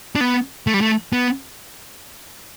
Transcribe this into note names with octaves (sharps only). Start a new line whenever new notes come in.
D4
B3
A3
G3
A3
B3